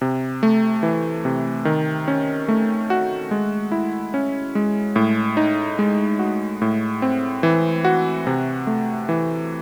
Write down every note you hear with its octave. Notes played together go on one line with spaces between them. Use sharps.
C3
A3
E3
C3
D#3
C#4
A3
F#4
G#3
E4
C#4
G#3
A2
D#4
G#3
F#4
A2
C4
E3
F#4
C3
A3
E3